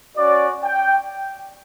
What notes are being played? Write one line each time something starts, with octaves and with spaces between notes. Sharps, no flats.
C#4 F#4 D5
G5